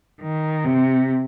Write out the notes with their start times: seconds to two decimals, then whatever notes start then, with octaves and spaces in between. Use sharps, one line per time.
0.22 D#3
0.65 C3